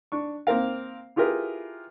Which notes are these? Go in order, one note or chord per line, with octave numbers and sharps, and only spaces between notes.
D4 C#6
A#3 C4 A#4 F5
E4 F4 G4 G#4 A#4 B4